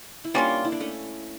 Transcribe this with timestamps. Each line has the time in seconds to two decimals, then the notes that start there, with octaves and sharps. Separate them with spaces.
0.24 E4
0.34 G3 A#3 C#4 D4 F4
0.65 E4
0.72 D4
0.80 A3 C#4